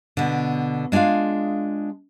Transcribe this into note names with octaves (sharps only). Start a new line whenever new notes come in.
B2 D3
G#3 D4 F4 G#4 F5